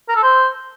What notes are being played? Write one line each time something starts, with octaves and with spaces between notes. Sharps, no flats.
A#4
A4
C5